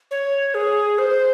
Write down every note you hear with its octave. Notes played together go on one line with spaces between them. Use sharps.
C#5
G#4
C5